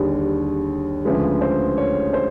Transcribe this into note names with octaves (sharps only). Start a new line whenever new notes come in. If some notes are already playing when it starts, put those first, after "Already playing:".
Already playing: D#2 D3 G3 G#4
D2 C#3 F3 G#3 B4
C5
C#5
C5